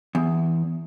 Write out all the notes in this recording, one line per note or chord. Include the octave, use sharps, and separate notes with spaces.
E2